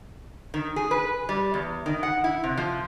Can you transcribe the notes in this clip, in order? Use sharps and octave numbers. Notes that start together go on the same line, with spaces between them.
D#3
G#4
B4
G3
E2
D#3
F#5
E4
C3
F3